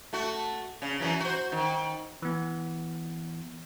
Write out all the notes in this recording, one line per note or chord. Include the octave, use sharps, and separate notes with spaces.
A3 F#4
C#3
F#2 E3 F#3
F#4 C5
D#3
E3 B3